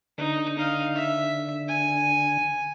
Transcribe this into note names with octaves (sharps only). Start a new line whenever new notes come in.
D3 D#4
D#4 F5
E5
G#5